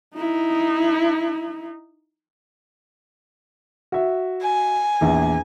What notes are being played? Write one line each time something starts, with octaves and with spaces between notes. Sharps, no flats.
D#4 E4
F#4 E5
G#5
A#1 E2